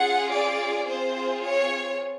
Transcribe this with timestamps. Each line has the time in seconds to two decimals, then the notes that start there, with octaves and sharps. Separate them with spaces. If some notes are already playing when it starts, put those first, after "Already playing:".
Already playing: C#4 F4 G#4 F#5
0.32 D5
0.89 C4 F4 G#4 C5
1.44 C#5